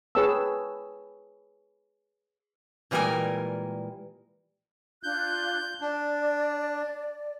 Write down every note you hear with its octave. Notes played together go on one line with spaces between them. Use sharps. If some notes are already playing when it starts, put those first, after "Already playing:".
G#4 B4 C#5 G5 A5 E6
A#2 E3 G3 G#3 A#4 G#5
D4 F4 F#6 G6
D4 D5